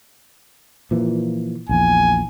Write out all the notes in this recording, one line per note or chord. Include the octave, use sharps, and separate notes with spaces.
A#2 E3 F3
A#1 E2 G#5